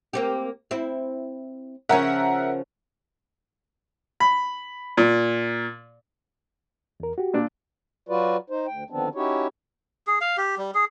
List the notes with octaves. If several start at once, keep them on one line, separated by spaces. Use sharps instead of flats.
A#3 C4 G4
C4 E4
C#3 F3 C#4 A#4 E5 F#5
B5
A#2
E2 A#4
F#4 G4
A#2 D4
F#3 F4 F#4 B4 D5
D#4 C5
D2 G5
D3 D#3 F3 B3 C4 D4
C#4 D#4 E4 F#4 G4 C#5
G#4
F5
G4
G3
G#4